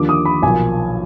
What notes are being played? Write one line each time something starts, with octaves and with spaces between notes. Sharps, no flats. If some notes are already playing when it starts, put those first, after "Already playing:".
Already playing: D#2 D3 F3 D6
D#6
B5
B1 A#2 F3 G#5